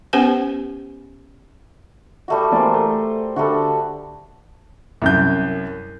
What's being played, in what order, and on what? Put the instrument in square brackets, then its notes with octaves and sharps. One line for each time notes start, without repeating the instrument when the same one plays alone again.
[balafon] B3 C#4 G4 B4 C5 G#5
[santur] G3 A3 F#4
[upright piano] E3 A#3 D5 [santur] A#4 C5
[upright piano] A3
[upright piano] D3 A4 [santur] G3 A3 F#4
[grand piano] C2 F#2 G6